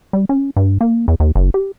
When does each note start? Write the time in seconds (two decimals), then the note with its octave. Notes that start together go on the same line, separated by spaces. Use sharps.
0.13 G3
0.29 C#4
0.56 G2
0.81 A#3
1.08 E2
1.20 D#2
1.35 F#1
1.54 G4